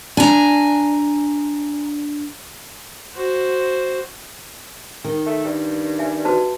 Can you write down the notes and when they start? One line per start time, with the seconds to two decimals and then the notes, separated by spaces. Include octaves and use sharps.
0.17 D4 G#5 A#5
3.15 F#4 C5
5.04 D#3
5.26 A3
5.45 G2
5.99 E5 G#5
6.25 F#4 B4 A5